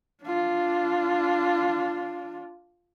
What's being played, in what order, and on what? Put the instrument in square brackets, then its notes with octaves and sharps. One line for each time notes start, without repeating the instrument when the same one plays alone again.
[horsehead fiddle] D4 F4